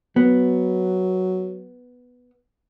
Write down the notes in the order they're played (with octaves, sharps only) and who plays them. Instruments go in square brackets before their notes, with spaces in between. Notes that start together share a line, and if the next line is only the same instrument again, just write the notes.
[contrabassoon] F#3 [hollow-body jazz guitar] B3